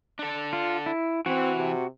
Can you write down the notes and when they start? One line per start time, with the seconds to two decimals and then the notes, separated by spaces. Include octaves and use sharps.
0.19 D4 A4
0.53 F4
0.86 E4
1.26 E3 C4 F#4
1.57 C3